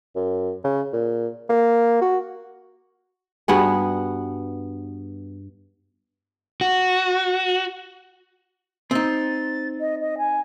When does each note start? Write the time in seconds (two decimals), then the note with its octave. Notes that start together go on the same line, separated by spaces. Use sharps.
0.15 F#2
0.64 C#3
0.93 A#2
1.49 A#3
2.01 F#4
3.48 G2 B3 F#4 G#4
6.61 F#4
8.91 C4 D#4 A6
9.80 D#5
10.00 D#5
10.18 G#5